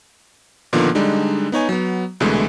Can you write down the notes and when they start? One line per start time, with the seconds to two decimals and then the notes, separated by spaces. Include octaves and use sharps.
0.73 A#2 D3 D#3 F3 A#3 B3
0.95 D3 G3 G#3 D4 D#4
1.52 B3 D#4 C#5 G#5
1.69 F#3 B3
2.20 C2 B2 D3 E3 G#3 A3